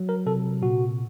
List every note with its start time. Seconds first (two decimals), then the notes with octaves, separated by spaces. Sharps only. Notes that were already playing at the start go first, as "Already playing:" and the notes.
Already playing: F#3
0.09 A#4
0.26 C3 A4
0.62 A#2 F#4